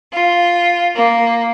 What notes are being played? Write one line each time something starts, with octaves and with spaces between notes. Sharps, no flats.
F4
A#3